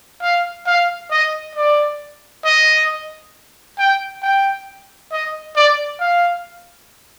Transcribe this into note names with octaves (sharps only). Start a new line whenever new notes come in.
F5
F5
D#5
D5
D#5
G5
G5
D#5
D5
F5